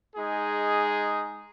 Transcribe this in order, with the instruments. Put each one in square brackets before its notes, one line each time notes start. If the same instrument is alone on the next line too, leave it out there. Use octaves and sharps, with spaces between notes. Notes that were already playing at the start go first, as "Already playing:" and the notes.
[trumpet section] G#3 D#4 G#4